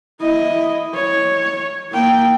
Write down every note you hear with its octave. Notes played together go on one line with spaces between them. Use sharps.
E4 D#5
C#5
A#3 G5